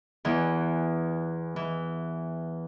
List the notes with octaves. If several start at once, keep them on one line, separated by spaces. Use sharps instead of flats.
E2 E3
E3